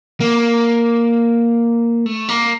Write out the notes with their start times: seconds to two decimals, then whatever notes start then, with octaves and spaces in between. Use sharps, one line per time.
0.20 A#3
2.06 A3
2.29 A#3